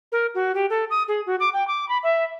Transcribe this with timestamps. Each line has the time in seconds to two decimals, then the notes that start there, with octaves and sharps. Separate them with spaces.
0.12 A#4
0.35 F#4
0.55 G4
0.70 A4
0.90 D#6
1.08 G#4
1.26 F#4
1.40 D6
1.53 G5
1.68 D6
1.89 B5
2.03 E5